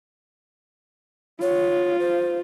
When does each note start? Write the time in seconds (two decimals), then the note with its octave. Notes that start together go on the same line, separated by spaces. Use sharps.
1.42 F4 C#5
1.99 C5